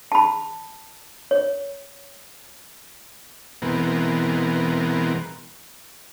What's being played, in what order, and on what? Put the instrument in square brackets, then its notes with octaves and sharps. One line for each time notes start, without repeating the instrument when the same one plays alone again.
[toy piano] A5 B5
C#5
[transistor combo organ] B2 E3 G#3 B3 C4 A#4